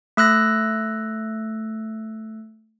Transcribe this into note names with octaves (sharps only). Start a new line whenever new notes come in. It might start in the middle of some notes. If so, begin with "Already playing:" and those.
A3 E6 F#6 A#6